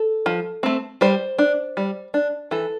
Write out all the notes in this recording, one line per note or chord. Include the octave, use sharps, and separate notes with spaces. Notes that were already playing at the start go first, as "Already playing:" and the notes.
Already playing: A4
F3
A3 C4
G3 C5
D4
G3
D4
E3 A4